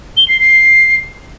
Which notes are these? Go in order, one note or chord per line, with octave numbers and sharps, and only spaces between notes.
G7
C7
C7